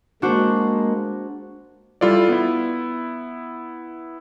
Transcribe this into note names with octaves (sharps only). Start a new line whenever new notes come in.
G#3 A#3 D4 F#4 C5
G3 E4 F4 A4 D5
B3 E4